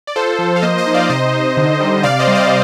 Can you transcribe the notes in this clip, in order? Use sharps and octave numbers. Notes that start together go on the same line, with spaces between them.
D5
F4 A4 C5
F3
F5
A#3 C5 D#5
C5 D#5
D#4
D5 F5
C3 C5 D#5
D#4
D3
G3
C3 D5 F5
C5 D#5
G3
C5 D#5